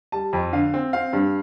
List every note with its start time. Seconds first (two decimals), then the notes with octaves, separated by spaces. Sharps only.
0.12 G3 A5
0.33 F2
0.53 D3 F5
0.74 C4
0.93 C4 F5
1.13 G2